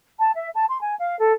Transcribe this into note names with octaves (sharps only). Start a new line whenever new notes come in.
A5
E5
A5
C6
G#5
F5
A4